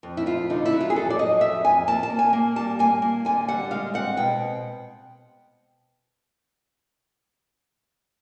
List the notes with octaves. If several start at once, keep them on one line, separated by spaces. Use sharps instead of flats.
F2
E4
F2 F4
D3 D#4
E4
F#3
F4
G#4
F2 A4
D5
F#3 D#5
F2 E5
F2 G#5
A#3 A5
A5
A#3
G#5
A#3
G3 A5
A#3 G#5
A#3
D3 G#5
G3 F#5
G#3 F5
C4 F#5
B2 G5